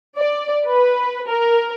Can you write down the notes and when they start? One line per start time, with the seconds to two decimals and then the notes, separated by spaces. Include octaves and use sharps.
0.17 D5
0.66 B4
1.30 A#4